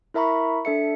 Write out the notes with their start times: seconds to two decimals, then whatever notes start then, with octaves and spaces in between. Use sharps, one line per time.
0.14 E4 A#4 E5 A#5 B5 C#6
0.65 D4 A4 E5 C#7